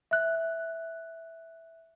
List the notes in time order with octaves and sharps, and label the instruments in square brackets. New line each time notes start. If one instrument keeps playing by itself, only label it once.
[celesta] E5 F#6